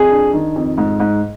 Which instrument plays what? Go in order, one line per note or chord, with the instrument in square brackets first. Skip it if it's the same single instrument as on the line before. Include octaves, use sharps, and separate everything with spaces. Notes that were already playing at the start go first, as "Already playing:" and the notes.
Already playing: [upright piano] F2 [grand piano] G#4
[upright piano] D4
D#3
F2
G#2
G#2